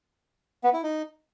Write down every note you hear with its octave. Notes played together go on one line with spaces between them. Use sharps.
B3
E4
D#4